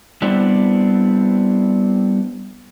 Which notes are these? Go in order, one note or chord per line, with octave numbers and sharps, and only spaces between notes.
G3 B3 C4 D4 E4